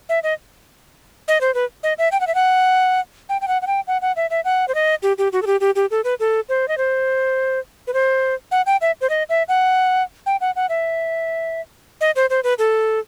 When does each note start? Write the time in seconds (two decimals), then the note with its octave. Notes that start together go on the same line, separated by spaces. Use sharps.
0.09 E5
0.23 D#5
1.28 D#5
1.41 C5
1.54 B4
1.83 D#5
1.98 E5
2.12 G5
2.21 F#5
2.27 E5
2.35 F#5
3.29 G5
3.41 G5
3.48 F#5
3.62 F#5
3.67 G5
3.87 F#5
4.02 F#5
4.16 E5
4.30 E5
4.45 F#5
4.68 C5
4.75 D#5
5.03 G4
5.18 G4
5.33 F#4
5.42 A4
5.47 G4
5.61 G4
5.76 G4
5.91 A4
6.04 B4
6.20 A4
6.49 C5
6.68 D#5
6.78 C5
7.87 B4
7.94 C5
8.51 F#5
8.66 G5
8.81 E5
9.01 C5
9.10 D#5
9.29 E5
9.48 F#5
10.26 G5
10.41 F#5
10.56 F#5
10.69 E5
12.01 D#5
12.16 C5
12.30 C5
12.44 B4
12.59 A4